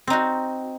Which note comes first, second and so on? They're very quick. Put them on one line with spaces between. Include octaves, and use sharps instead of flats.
C4 D#4 F#4